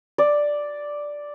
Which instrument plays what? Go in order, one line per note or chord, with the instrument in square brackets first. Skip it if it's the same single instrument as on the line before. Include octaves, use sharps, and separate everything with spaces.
[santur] D5